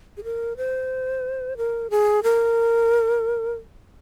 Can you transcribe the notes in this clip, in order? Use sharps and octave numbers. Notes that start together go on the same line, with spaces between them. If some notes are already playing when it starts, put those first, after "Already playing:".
G#4
A#4
C5
A#4
G#4
A#4